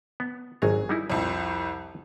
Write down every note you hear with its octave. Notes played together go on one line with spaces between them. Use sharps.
B3
G#1 F#3 G#4 A#5
G3 D#4 E4
C2 F2